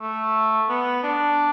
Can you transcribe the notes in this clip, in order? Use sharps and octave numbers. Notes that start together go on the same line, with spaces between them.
A3
B3
D4